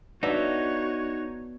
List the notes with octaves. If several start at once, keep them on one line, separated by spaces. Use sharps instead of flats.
B3 D4 D#4 F#4 C#5 E5